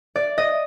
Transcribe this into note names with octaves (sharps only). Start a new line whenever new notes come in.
D5
D#5